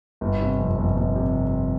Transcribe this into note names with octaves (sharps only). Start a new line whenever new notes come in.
G1
C3
F2
G1
G1
C3